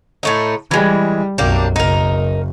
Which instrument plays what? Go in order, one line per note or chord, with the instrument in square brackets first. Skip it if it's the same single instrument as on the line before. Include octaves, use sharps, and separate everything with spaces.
[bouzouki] A2 A3 D#4
[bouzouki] E3 G#3 [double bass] G3
[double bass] B1 F#2 [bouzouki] G3 A#3 D4
[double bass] F#1 [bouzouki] D#4 A#4